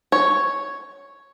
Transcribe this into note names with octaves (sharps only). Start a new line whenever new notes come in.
C#5